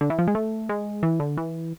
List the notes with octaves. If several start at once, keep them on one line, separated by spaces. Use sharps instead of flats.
D3
E3
F3
G#3
A3
G#3
E3
D3
E3